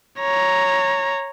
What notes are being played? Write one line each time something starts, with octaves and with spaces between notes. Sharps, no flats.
C#5 A#5